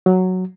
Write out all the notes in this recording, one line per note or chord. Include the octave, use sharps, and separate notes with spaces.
F#3